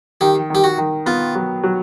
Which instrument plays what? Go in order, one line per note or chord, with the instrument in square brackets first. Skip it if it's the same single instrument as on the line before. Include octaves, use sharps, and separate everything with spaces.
[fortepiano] D#3 [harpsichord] G4
[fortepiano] D#3 [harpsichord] G4
[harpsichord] F#4
[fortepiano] D#3
[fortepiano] B3 [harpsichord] F4
[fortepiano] F#3
F#3